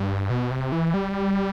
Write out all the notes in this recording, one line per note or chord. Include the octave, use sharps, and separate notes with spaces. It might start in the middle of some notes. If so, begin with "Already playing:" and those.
Already playing: G2
B2
C3
E3
G3